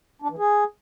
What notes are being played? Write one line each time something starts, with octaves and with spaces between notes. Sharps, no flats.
D4
E3
G#4